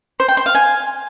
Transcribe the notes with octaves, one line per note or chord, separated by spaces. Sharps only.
C5
G5
C6
F5
G#5